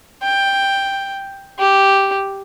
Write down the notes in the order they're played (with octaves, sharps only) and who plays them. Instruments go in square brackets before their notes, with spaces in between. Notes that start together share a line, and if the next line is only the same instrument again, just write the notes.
[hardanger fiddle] G5
G4